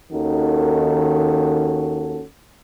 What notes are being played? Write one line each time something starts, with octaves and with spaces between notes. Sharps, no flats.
D#2 D#3 C#4 F#4 A4